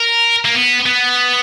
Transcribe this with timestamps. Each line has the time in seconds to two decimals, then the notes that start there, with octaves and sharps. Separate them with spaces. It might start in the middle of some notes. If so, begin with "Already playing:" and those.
Already playing: A#4
0.45 A#3
0.54 B3
0.86 B3